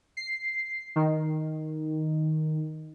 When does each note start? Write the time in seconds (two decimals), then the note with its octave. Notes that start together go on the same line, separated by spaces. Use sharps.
0.17 C7
0.96 D#3